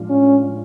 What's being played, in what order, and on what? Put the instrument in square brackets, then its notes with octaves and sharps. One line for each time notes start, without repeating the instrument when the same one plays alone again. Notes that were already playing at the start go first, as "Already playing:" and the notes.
Already playing: [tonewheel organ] A2 F3 G#3 D4 F4
[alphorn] C#4